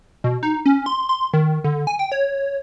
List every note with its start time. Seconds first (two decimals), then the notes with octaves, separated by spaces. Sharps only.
0.24 B2
0.43 D#4
0.66 C#4
0.86 C6
1.09 C6
1.33 D#3
1.64 D3
1.87 G#5
1.99 G5
2.12 C#5